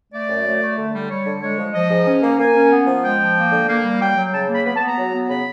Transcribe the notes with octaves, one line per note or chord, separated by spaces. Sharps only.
A3 D5
F#2
A3
A3
D3
G3
G3 C#5
D3
G#3 C#5
F3
F3 D#5
G#2
C#4
A#3
A#3 G#5
C#4
B3
F3
G#3 G5
F3
A#3
D3
A#3
G3
F#3 G5
F#3
C#3 A5
A#3
B5
B3 B5
A5
B3
A#5
F#3
B3
C#3 B5